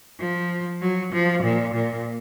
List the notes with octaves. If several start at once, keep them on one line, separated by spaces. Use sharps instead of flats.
F3
F#3
F3
A#2
A#2